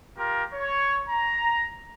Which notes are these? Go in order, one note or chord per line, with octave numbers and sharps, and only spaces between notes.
F4 G4 A#4
C#5
A#5